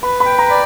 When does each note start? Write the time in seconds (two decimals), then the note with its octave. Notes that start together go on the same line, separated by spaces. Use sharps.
0.03 B4 B5
0.20 B5
0.26 G5
0.39 A#5
0.50 D5